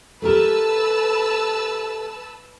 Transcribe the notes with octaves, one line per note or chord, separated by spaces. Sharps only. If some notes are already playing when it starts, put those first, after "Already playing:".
A3 G4 A#4 B4 A5 E6